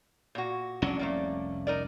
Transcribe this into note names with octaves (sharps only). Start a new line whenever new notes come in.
A#2 F#4
F1 C2 F#3 C#4 D4
A3 A#3 D5
D#4 A#4 D5